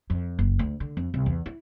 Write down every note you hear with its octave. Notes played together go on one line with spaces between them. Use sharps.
F2
F#1
D2
D3
F2
C2
E2
E4